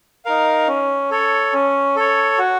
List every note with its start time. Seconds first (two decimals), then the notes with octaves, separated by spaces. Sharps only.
0.25 D#4 A#4 F5
0.67 C#4
1.11 A4 C#5
1.53 C#4
1.96 A4 C#5
2.38 F#4